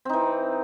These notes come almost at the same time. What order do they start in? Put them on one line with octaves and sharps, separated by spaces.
C4 D#4 E3